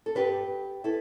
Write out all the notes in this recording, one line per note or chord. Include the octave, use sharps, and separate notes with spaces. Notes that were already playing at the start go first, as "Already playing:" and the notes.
A4
G2 G3 B3 G4 B4
B3 E4 A4